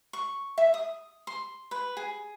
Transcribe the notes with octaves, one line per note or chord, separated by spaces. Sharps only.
C#6
E5
D#6
C6
B4
G#4